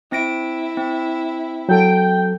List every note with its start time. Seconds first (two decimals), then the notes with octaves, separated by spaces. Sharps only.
0.12 C4 E4 A#6 D7
0.77 C4
1.69 F#3 A4 G5